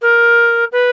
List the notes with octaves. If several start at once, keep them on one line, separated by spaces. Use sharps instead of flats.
A#4
B4